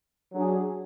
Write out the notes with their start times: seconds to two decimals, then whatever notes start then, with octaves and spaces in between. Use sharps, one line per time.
0.32 F#3 D4 G#4